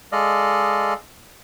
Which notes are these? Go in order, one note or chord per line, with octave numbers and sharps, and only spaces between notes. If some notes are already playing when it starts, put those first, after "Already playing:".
G#3 A4 D5 D#5 F5